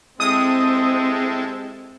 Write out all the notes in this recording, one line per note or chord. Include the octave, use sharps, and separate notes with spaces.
G#3 C4 E4 G4 A4 D#6